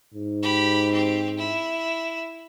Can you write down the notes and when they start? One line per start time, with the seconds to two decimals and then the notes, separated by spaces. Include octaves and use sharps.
0.14 G#2
0.43 G4 B5
0.92 C4 G4
1.38 E4